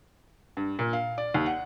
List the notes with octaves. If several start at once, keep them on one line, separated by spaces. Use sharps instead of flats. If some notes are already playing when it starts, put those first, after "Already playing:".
G2
A#2
F5
D5
D#2
F#5